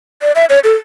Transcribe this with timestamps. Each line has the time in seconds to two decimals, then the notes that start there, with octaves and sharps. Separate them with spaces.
0.22 D5
0.35 E5
0.50 C#5
0.64 A4